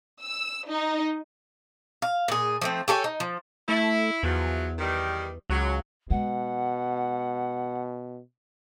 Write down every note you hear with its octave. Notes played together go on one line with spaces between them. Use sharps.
E6
D#4
F5
A#2 G#4
F3 A3 C4
G4 A4 C#5 G#5
D#4
F3
A3 E4
E2 F3 F#3
D#3 G3
C#2 F#3
B2 G#3 F#5